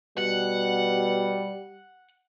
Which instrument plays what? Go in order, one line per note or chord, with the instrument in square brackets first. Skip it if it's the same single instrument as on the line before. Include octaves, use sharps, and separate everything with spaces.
[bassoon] B2 [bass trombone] G3 [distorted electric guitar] F#5